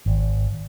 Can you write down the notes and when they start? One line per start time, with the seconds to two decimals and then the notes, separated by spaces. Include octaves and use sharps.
0.06 G#1